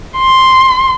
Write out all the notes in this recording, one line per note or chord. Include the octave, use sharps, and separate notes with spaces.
C6